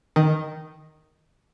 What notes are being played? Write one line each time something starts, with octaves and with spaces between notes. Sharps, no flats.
D#3